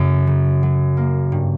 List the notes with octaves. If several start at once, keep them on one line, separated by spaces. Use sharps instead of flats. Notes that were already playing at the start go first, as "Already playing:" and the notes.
Already playing: F#2 C#3 F#3 A3
C#3
F#3
A#3
G2